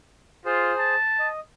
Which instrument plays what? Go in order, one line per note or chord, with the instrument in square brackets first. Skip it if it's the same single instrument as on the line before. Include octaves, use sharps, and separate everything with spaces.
[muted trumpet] F4 [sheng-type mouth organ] G#4 C5
[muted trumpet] A5
[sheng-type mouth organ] D#5